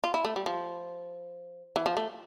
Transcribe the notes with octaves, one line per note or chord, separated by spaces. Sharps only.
F4
E4
A3
G3
F3
E3
F3
A3